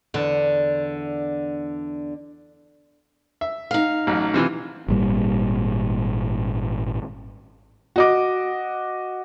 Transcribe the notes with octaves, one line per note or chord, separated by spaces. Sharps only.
E2 D3
E5
D#4 F5
A1 F#3
C3 E3 F4
G#1 A#2 G3
F#4 D#5 D6